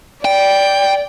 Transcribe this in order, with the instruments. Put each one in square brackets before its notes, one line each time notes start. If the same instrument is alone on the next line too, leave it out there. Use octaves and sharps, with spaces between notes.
[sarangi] D5 [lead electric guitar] G5